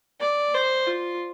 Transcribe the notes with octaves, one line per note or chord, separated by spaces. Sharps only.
D5
C5
F4